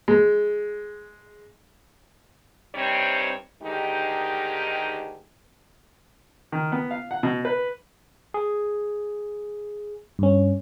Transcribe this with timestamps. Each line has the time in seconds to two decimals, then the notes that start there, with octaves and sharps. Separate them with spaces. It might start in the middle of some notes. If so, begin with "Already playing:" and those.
0.08 G#3
2.75 G2 C3 G3 C4 D#4 C#5
3.63 D2 D#3 G#3 D#4 G4
6.52 D#3
6.72 B3
6.91 F5
7.11 F#5
7.23 B2
7.45 B4
8.34 G#4
10.19 G2 C#4